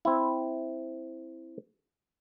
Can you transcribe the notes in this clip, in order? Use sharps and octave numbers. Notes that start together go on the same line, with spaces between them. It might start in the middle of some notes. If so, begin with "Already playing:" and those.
C4 E4